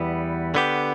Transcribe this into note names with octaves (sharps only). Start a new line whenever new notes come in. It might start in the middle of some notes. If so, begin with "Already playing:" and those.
Already playing: E2 E3 G3 B3
D3 B3 G4